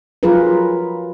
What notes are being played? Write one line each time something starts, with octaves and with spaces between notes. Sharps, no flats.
F3 F#3 F4 G#4 A#4 B4